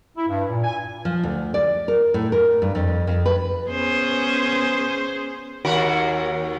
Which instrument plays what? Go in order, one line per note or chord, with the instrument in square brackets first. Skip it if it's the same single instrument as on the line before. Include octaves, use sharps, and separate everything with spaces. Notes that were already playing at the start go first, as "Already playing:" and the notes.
[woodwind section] E4
G2
A#2
G#5
[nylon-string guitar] F3
D2
D5
A#4
A2
A#4
G2
F2
F2
B4
[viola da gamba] B3 C#4 G#4 [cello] C5
[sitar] D#2 F#4 A#4